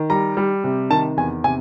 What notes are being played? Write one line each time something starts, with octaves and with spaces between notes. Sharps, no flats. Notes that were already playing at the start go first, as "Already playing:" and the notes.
Already playing: D#3
G3 A#5
G3
C3
D#3 A5
E2 G#5
C3 G#5